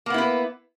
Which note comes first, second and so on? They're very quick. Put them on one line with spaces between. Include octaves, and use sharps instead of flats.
A#3 B3 E4 B4